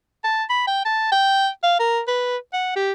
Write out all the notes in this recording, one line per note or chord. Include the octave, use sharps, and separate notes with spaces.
A5
B5
G5
A5
G5
F5
A#4
B4
F#5
G4